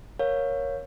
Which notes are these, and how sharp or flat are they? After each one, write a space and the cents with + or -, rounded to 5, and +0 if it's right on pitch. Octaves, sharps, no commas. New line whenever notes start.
A#4 +10 C#5 +0 F5 +20